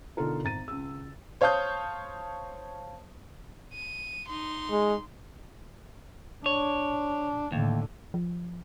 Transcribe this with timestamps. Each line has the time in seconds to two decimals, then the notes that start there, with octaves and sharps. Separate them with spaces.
0.17 B2 D3 D#4 F4 A4 A#4
0.44 G#1 A#5 A6 D#7
0.68 C#2 E6
1.41 C5 C#5 F5 A5 D#6 G6
3.74 D#7
4.28 D#4 C6
4.71 G#3
6.46 D4 C#5
7.52 D#2 A2 D3
8.14 F3